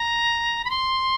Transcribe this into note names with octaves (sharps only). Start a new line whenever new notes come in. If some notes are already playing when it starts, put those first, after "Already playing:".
Already playing: A#5
B5
C6